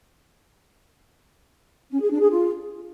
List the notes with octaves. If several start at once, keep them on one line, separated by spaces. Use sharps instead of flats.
C#4
G#4
D4
G#4
F4